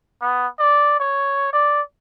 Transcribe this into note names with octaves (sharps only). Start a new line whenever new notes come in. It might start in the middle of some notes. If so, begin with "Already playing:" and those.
B3
D5
C#5
D5